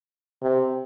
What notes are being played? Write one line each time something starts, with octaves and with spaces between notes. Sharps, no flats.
C3